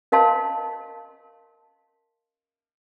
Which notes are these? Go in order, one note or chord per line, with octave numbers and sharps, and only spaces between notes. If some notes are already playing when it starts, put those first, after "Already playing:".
C#4 A#4 D#5 F5 A5 C6